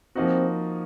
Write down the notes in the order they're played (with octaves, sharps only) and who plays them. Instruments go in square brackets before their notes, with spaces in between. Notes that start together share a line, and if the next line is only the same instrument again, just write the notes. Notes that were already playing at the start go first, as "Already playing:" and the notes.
[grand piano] F3 A#3 D#4 F#4 [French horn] C4